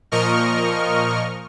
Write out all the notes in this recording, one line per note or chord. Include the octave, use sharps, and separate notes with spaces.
A#2 F3 A#4 D#5 C#6 F6